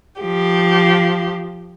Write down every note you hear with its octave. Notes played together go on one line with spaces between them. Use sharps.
F3 G4